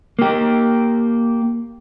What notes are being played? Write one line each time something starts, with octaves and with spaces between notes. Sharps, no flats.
A#3 G4